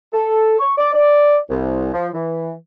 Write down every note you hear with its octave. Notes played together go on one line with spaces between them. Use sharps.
A4
C#6
D5
D5
C2
F3
E3